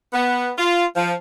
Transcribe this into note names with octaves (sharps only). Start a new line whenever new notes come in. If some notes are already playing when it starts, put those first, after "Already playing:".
B3
F4
F3